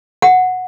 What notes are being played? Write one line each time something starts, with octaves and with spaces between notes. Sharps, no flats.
F#5